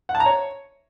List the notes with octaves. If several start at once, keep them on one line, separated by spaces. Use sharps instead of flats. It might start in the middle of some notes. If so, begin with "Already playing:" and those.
F#5
A5
A#5
C#5